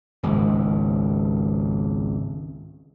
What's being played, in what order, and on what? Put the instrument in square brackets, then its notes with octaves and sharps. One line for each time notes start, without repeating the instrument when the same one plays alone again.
[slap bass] G#1 C#2